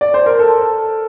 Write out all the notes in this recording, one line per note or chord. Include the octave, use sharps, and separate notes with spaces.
D5
C5
A#4
A4